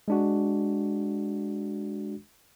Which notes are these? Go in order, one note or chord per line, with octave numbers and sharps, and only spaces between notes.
G#3 D4 F#4